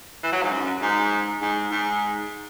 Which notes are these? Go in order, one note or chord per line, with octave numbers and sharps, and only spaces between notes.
E3
F#3
G#2
F#2
G#2
G#2
G#2